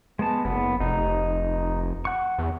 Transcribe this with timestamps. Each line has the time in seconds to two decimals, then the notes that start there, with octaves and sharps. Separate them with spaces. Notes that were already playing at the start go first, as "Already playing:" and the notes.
0.19 G#3 B3 A5
0.45 F#1 B3
0.80 F1 D#4
2.05 F#5 C#6
2.38 E2